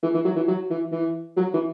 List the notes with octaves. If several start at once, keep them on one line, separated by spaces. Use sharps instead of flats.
E3
E3
F#3
E3
F#3
E3
E3
F#3
E3